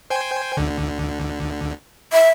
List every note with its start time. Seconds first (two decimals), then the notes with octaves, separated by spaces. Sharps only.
0.10 C5 G5 G#5
0.57 D2 D3
2.13 E5